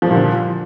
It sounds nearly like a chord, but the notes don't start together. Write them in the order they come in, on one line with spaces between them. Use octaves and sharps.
F3 G3 A#2 D3